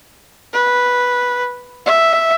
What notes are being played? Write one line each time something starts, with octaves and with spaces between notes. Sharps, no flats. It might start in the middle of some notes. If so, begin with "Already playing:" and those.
B4
E5